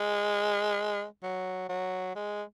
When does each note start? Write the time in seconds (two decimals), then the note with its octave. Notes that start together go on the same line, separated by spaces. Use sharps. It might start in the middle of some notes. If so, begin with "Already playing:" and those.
Already playing: G#3
1.23 F#3
1.69 F#3
2.15 G#3